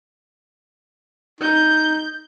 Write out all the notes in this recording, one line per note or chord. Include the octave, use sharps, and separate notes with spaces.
D#4 G6